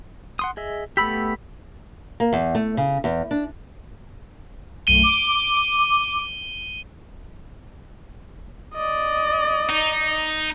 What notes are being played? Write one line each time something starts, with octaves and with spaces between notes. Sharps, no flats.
F#5 C6 D#6
G#4 D#5 E5
A3 B3 G4 B5 E6 B6
A#3
E2
A3
C#3
E2
D4
B1 F#2 A3 D#7 G7
D6
D5 D#5
D#4